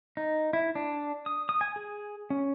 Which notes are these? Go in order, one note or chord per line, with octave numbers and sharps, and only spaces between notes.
D#4
E4
D4
D#6
D#6
G#5
G#4
C#4